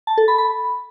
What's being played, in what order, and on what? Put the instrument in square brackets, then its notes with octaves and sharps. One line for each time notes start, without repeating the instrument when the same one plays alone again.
[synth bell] A5
A4
B5
B5